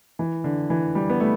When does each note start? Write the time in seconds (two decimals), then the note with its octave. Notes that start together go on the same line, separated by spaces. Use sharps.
0.19 E3
0.44 D3
0.70 E3
0.95 G3
1.10 B3
1.20 A3